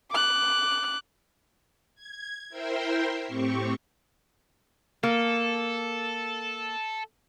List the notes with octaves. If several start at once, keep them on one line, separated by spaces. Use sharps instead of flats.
D6 F#6
G#6
E4 A#4 C5 E5 G5 C6
A2 C4 G4 C#6
A#3 A4